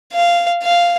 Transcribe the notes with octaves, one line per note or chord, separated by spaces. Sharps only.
F5
F5